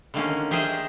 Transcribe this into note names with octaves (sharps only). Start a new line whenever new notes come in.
D3 D#3 A#3 C#4
G4 G#4 A#4 C5 D#5 E5